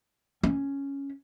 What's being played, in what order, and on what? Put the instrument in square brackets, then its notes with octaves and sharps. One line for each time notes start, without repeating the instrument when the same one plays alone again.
[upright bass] C#4